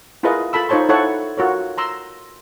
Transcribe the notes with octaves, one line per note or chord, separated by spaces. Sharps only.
E4 F4 G#4 A#4 B4 D#5
F4 A4 A5 B5 E6
D#4 F4 C5 C#5 A5 C6
E4 A4 C#5 F#5 A5
F4 F#4 A#4 C#5
A#5 C6 E6